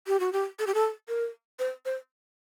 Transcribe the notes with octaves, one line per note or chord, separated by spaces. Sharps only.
G4
F#4
G4
A4
G4
A4
A#4
C5
C5